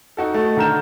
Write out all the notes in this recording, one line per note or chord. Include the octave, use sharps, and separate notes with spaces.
D#4 F#4 A4
A3
D3 D#3 A#4 A#5 G6 E7